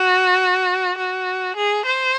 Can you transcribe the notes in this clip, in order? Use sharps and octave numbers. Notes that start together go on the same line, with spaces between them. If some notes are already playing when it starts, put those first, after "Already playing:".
Already playing: F#4
F#4
G#4
C5